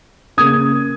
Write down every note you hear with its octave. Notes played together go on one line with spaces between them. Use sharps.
C#3 A#3 C#4 D#6 G#6